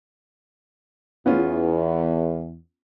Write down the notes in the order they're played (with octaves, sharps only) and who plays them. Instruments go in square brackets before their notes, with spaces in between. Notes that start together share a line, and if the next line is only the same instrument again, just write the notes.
[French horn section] E2 [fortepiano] B3 C#4 F4